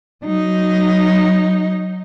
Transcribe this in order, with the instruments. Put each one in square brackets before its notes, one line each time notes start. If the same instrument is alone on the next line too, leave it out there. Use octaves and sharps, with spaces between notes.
[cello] F#3 D#4